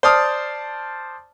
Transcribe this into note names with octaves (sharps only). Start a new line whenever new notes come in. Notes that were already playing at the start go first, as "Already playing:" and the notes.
C5 D5 A5 D#6 F6